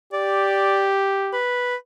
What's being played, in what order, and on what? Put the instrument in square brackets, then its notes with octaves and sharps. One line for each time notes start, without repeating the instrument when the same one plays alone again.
[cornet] G4 [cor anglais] D5
[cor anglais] B4